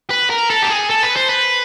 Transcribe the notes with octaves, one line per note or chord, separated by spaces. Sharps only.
B4
A#4
A4
G4
G#4
A4
B4
C5
B4